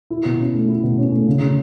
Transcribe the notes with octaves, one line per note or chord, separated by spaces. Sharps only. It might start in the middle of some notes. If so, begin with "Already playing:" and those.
E4
B2
C#4
A3
E4
B2
C#4
A3
C#3
C#3